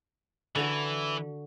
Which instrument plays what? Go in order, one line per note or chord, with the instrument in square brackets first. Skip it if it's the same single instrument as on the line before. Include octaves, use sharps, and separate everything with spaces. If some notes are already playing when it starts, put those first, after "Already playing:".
[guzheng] D3 F#4 [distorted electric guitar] E3